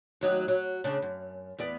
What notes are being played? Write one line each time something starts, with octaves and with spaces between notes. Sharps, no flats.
D#2 F#3 D#4
F#3
C#3 D4
F#2
E2 B3 D5